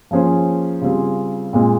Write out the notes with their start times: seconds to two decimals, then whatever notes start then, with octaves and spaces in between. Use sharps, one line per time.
0.11 F3 A#3 C#4 G#4 C5
0.81 C#3 G3 C4 F4 G#4
1.53 A#2 G#3 C4